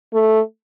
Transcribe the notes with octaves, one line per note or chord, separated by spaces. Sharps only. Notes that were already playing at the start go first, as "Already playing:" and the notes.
A3